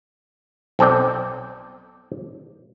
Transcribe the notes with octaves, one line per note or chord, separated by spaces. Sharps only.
B1 C4 A4 D5 G5